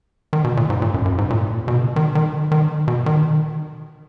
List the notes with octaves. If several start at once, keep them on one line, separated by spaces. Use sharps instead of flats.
D#3
B2
A#2
G#2
A#2
F#2
F#2
G#2
A#2
B2
C#3
D#3
D#3
D#3
B2
D#3